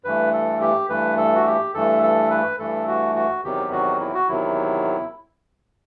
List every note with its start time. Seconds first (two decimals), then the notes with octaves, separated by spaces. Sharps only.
0.04 G2 E3 A3 B4
0.33 A4
0.61 G4
0.89 G2 E3 A3 B4
1.18 A4
1.35 F#4
1.46 G4
1.74 G2 E3 A3 A4
2.03 A4
2.31 B4
2.59 G2 E3 A3 A4
2.88 F#4
3.16 F#4
3.44 E2 C3 D#3 F#3 G4
3.72 F#4
4.00 E4
4.14 F#4
4.28 E2 C3 D#3 F#3 E4